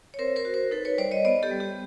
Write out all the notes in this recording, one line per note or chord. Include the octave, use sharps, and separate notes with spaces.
C#5
C4 A#4 C5
A#4 C5
F#4
A#4 C5
D#4 A4 B4
B4 C#5
G3 C5 D5
C#5 D#5
B3 C5 D5
G4 A4
G3
G4